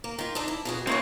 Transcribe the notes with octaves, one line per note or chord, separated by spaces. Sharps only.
A#3
D#3 F4
D4 D#4 A4
E4
F2 B2 G#4
C#3 A#3 C4 B4 C#5